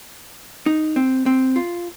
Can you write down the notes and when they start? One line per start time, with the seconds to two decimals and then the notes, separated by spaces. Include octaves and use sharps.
0.66 D#4
0.96 C4
1.26 C4
1.56 F4